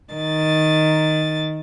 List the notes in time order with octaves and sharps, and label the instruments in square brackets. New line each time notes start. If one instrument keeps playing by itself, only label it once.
[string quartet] D#3 A6